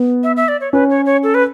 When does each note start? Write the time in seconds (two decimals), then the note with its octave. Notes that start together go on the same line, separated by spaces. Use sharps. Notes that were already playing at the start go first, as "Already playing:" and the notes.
Already playing: B3
0.23 E5
0.37 E5
0.48 D5
0.60 C#5
0.73 C#4 B4
0.90 C#5
1.06 C#5
1.23 A4
1.34 B4